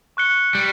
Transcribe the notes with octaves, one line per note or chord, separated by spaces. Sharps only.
C#6 F#6 C#7 G7
G3